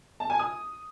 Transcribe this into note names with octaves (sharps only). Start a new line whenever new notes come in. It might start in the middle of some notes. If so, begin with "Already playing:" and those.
A5
G#5
D#6